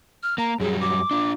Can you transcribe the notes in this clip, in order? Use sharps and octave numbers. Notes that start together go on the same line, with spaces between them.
F6
A#3 A#5
F#2 F#3 G3 G#4
D6
D4 F4